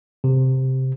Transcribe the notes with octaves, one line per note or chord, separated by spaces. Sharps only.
C3